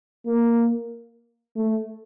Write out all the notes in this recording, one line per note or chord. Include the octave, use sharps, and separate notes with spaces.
A#3
A3